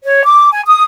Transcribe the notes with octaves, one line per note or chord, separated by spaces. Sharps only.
C#5
D6
G#5
D#6